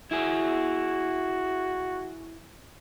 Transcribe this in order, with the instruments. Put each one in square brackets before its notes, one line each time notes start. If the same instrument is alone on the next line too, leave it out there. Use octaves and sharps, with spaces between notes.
[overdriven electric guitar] E4 G#4 [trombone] F#4